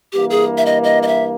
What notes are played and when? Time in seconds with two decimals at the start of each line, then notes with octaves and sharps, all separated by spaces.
0.12 G2 E3 A#3 G4
0.30 G#4
0.57 E5
0.66 D#5
0.84 D#5
1.03 D#5
1.07 E5